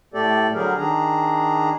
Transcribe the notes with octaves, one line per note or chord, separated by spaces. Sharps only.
A2 A3 G4 A4 D5
D3 F#3 G3 G4 G#4 A#4
D#3 D4 G#4 A#5